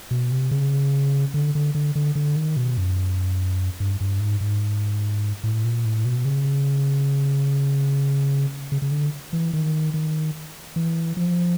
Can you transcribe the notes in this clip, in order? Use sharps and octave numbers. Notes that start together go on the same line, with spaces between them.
B2
C3
C#3
D3
D3
D3
D3
D3
D#3
B2
F#2
G2
G2
G#2
G#2
A2
A#2
A2
B2
C#3
C#3
C#3
D3
E3
D#3
D#3
E3
F3